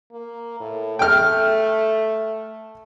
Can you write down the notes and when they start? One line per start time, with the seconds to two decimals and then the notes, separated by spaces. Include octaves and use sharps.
0.12 A#3
0.60 A2
0.99 A3 G5 F6